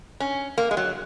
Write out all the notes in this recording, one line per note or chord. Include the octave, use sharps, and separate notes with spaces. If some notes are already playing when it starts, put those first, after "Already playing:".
C#4
A#3
G#3
F#3